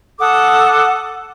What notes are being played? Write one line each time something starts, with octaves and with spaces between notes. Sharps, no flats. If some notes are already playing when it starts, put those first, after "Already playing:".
A4 F#5 D6 D#6